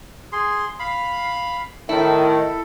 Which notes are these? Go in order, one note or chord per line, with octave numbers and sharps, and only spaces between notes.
G#4 C6
F5 B5
A2 D#3 E4 A4